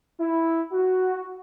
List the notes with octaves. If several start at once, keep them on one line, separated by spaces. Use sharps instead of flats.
E4
F#4